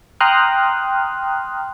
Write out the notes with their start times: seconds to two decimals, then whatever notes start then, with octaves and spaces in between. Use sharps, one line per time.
0.20 G5 A#5 C6 D#6 F6 F#6